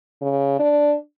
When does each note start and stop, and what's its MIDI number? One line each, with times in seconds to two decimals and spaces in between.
0.22 0.58 49
0.59 0.95 62